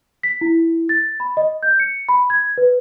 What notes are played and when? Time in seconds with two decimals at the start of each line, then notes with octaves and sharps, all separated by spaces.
0.23 B6
0.41 E4
0.89 A6
1.20 B5
1.37 D#5
1.63 G6
1.80 C#7
2.09 B5
2.30 G#6
2.58 B4